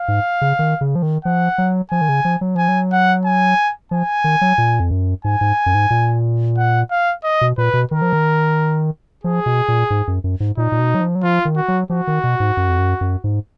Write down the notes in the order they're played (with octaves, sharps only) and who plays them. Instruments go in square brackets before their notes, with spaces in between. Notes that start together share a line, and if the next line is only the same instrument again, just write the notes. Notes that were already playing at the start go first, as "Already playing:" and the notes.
Already playing: [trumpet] F5
[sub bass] G#2
C#3
D#3
C#3
F3
D#3
[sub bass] F3 [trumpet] F#5
[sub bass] F#3
[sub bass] F3 [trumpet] G#5
[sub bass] D#3
C#3
F3
F#3
[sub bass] F3 [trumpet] G#5
[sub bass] F#3
[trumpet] F#5
G#5
[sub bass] F3 [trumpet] G#5
[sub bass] D#3
F#3
A#2
F2
F#2
[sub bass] G#2 [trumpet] G#5
[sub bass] G#2
F#2
G#2
A#2
[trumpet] F#5
F5
D#5
[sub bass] B2
[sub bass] A#2 [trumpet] B4
[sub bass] B2
[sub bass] D#3 [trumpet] A#4
[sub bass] F3
D#3
[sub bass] F3 [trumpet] G#4
[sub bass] B2
A#2
G#2
F#2
F#2
G#2
[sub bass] A#2 [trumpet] D#4
[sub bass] A#2
B2
F#3
F3
F#3
[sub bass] F3 [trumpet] F4
[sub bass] D#3
[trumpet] F#4
[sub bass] F#3
[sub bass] F3 [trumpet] F#4
[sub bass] D#3
B2
G#2
F#2
F2
F#2
F#2
G#2